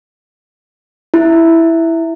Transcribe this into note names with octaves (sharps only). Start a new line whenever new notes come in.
E4